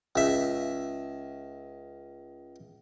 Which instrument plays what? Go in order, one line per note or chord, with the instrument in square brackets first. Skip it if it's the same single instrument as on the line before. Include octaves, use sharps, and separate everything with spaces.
[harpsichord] C#2 E5